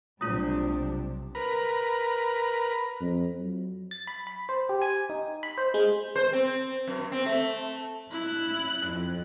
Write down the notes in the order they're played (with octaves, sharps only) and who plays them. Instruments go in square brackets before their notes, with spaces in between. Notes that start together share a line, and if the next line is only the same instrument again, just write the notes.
[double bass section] B1 C3 [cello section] F#3 G3 D4 [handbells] A3 F4 [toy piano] D#6
[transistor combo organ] A#4 B4
[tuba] F2
F#3
[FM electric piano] A6
B5
B5
C5
G4
G#5
D#4
B5
C5
G#3
[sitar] C5
C4
F#2
C4
A3
[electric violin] E4 [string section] F#6
[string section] F2